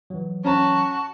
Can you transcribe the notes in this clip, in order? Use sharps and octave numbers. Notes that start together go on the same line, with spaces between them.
E3 F#3
C#4 F#4 A5 A#5